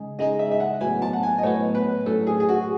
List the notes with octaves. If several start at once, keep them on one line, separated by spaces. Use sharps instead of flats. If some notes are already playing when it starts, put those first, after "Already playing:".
Already playing: C#3 G#3 D#4 G#4
C#3 G#3 D#4 G#4 D#5
E5
E5
F#5
A2 F#3 B3 G#5
A5
F#5
G#5
D#5
A2 F#3 B3 C#5
B4
A2 F#3 C#4 A4
G#4
G#4
F#4